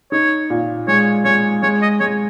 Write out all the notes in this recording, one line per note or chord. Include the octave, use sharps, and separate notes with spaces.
D#4 C#5
A#2
G#3 C#5
G#3 C#5
G#3 C#5
D#5
G#3 C#5